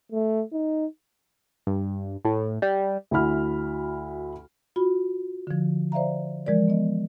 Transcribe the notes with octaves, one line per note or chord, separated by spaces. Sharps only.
A3
D#4
G2
A2
G3
D2 E4 F#4 B5 F6
F4 F#4 B5
D3 F3
C5 D5 E5 F5 A#5
E3 F3 G#3 A#4 D5
B3 D#5